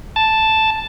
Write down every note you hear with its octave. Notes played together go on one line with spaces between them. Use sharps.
A5